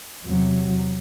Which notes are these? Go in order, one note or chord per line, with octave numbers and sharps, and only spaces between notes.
E2 C3 F#3